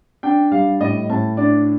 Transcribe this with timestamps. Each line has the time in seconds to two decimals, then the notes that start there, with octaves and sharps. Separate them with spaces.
0.23 D4 G5
0.52 G3 F5
0.80 A2 D#5
1.10 A2 A5
1.37 D4 D5